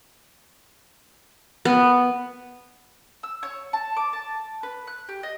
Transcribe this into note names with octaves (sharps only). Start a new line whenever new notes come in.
B3
E6
C#5
A5
D6
A5
B4
F#6
G4
D#5